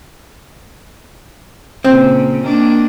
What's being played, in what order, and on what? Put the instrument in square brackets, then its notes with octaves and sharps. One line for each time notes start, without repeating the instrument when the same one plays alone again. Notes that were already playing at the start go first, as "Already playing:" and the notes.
[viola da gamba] A#2 C#3 [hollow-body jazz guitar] C4
[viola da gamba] D#3 A#3 D4